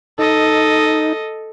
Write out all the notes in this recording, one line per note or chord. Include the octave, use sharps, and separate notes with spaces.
D#4 A4 D#5